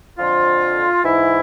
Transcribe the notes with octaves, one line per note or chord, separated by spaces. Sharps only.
F2 D3 F3 F4
G#2 E3 E4